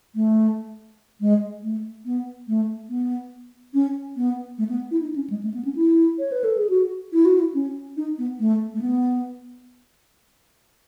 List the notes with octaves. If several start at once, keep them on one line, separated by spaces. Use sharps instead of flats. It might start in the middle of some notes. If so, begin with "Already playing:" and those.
A3
G#3
A3
B3
A3
B3
C#4
B3
A3
B3
E4
D#4
C#4
G#3
A3
B3
C#4
E4
C#5
B4
A4
G#4
F#4
E4
F#4
E4
C#4
D#4
B3
A3
A3
B3